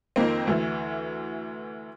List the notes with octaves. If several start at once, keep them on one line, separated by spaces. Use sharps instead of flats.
F2 D#3 A#3 C4
D2 E3